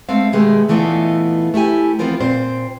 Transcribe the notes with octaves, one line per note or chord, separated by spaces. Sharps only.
G#3 A3 B3 C4 F5
B2 D#3 G#3 A3 B3 G4
A#2 E3 A3 B3 D#4 F4
A3 E4 G4 G#5
E3 F3 B3 C4 F4 A#4
A#2 C4 C5